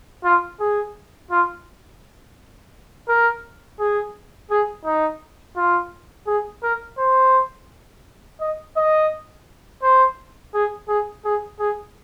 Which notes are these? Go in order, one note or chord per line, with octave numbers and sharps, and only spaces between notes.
F4
G#4
F4
A#4
G#4
G#4
D#4
F4
G#4
A#4
C5
D#5
D#5
C5
G#4
G#4
G#4
G#4